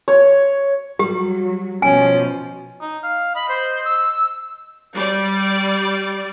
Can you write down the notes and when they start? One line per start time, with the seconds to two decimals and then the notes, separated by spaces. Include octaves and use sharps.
0.08 C#5
0.99 F#3 G3 G4
1.82 B2 F3 C#4 G#5
2.81 D#4
3.03 F5
3.35 D#5 B5
3.49 C5
3.84 E6
4.94 G3 D5